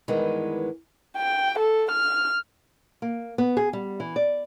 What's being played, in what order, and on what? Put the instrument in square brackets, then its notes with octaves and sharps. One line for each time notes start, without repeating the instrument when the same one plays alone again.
[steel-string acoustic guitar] G2 D#3 E3 G#3 B3
[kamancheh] G5
A4
F6
[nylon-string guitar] A#3
B3
G#4
G3
E3
D5